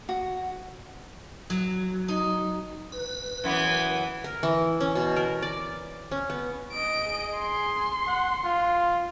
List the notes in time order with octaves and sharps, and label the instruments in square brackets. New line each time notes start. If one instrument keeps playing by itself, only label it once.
[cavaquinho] F#4
[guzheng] F#3
D#4
[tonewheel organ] B4
[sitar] F#2 E3 B3
[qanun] A#4
E3
C#4
B2
A#4
D5
C#4
B3
[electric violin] D#5 D7
[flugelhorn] G#4
[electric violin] C6
[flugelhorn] F#5
F4